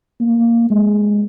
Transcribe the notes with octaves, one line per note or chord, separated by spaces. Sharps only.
A#3
G#3